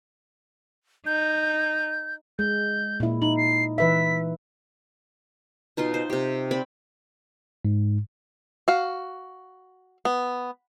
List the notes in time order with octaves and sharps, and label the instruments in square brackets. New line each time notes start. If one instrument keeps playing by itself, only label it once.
[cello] D#4 [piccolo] G6
[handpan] G#3 [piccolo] G6
[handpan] A#2 E4
[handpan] D#4 [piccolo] F#7
[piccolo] C7
[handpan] E3 B4 E5 [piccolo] B6
[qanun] B2 D#4 F4 C6
C5
C3 G4
C4 D5 B5
[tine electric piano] G#2
[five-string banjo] F#4 F5
B3